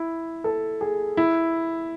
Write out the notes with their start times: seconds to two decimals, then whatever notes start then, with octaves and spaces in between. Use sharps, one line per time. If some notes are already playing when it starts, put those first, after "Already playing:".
Already playing: E4
0.44 A4
0.81 G#4
1.17 E4